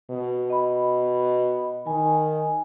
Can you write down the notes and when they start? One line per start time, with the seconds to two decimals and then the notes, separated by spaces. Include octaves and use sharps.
0.10 B2
0.50 D#5 B5
1.87 D#3 G#5